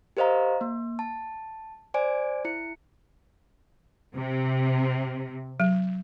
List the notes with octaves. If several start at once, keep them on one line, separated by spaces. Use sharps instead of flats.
G4 A#4 C5 D#5 F5 A#5
A#3
A5
C5 D5 G#5 D7
E4 C#7
C3
F#3